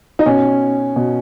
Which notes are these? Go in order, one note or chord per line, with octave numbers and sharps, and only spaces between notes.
D#4
B2 C#4
B2